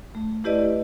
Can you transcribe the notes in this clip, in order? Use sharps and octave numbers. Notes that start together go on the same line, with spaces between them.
A3
A3 E4 G4 B4 D5 D#5